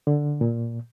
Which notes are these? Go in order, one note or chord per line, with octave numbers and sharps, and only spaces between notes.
D3
A#2